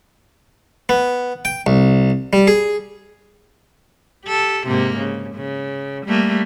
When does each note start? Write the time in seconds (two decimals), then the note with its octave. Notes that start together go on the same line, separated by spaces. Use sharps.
0.89 B3
1.45 G5
1.67 C2
2.33 G3
2.47 G#4
4.25 G4 A4
4.67 G#2 C3 A#3
4.98 C#3
5.36 C#3
6.06 G3 A3 A#3